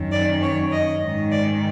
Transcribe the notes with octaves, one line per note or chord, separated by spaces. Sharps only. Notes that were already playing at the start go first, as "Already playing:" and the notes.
Already playing: F#2 D#3
D5
C#5
D#5
G#2 D#3
D5